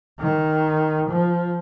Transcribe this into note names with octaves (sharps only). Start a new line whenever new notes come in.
D#3
F3